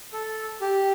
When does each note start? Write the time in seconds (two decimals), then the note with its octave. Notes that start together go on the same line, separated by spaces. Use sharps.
0.13 A4
0.61 G4